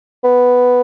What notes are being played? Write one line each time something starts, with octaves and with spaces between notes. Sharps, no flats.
B3